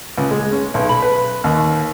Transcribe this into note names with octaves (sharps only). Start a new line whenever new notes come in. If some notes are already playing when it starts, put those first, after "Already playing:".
C#2
G#3
C#4
B1
B5
B4
D#2